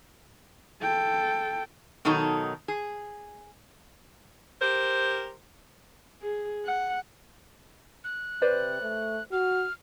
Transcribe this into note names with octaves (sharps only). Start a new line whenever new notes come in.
A4 G5
B2 D#3 F#3 D#4 A4
G#4
G4 A#4 C5
G#4
F#5
F#6
C3 B4 C5 D5
A3
F#4 F6